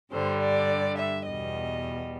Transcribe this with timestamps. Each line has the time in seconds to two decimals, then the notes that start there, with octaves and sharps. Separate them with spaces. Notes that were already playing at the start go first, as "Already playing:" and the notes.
0.12 G2 D3 G3 C5
0.40 D5
0.98 E5
1.26 E2 B2 G3 D#5